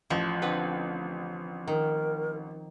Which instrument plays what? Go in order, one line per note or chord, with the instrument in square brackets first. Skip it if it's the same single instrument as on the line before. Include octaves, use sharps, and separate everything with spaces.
[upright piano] A1 [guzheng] F3
[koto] D3 C4 B4
[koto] D#3 [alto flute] A#4